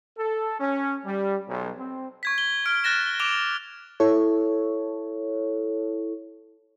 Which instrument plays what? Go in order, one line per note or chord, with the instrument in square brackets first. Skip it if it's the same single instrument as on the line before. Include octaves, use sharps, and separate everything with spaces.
[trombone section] A4
C#4
G3
B1
C4
[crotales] C#6 G#6 B6
G7
F6 D7
F6 F#6 A6 A#6 E7
D6 D7 F7 G7
[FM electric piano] E4 A4 C#5